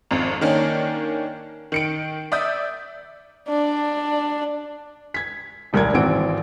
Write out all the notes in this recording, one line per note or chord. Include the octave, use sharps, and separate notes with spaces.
G#1 F2
D#3 A#3 C#4 D4
D#3 C#7 D7
D5 E5 D#6 G6
D4
G#6 B6
D#1 C2 A#4 D5 G#6
G#1 E3 C4 F#5 D7